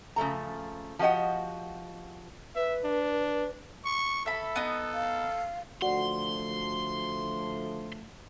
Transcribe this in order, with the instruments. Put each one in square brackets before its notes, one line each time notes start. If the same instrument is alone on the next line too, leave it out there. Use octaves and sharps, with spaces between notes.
[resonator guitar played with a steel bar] C#3 F3 A3 A#5
F3 F#4 G4 D#5 F#5
[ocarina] B4 [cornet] E5
[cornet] D4
[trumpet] C#6
[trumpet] A4 [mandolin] E5 B5
[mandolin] B3 D#4
[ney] F5
[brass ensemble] D3 F3 A3 [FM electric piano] F#4 [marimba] D5 F#5 [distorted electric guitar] C6